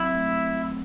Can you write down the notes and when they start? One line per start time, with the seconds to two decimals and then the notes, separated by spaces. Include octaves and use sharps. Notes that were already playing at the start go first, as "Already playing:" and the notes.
Already playing: F#3 C4 E4
0.12 A3